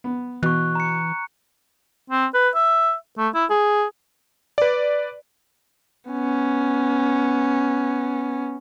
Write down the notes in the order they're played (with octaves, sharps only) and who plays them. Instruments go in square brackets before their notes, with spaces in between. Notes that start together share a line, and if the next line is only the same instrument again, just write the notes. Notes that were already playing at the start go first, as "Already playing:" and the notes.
[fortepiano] B3
[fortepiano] B2 [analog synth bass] E3 [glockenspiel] C#6 F#6
[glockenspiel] A#5 C#7
[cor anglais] C4
B4
E5
A3
E4
G#4
[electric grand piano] B4 D5
[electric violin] B3 C#4